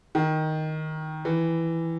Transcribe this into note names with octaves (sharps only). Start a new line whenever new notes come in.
D#3
E3